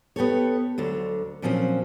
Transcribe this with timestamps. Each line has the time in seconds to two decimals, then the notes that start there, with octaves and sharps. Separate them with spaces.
0.16 B3 G4 A4 C#5
0.78 D2 D3 F#3
1.42 A#2 F3 F#3 C4 C#4